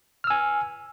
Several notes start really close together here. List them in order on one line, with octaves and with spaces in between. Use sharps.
F6 E6 G#5